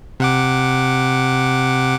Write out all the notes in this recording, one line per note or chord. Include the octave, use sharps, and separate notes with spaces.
C3 F#5 D6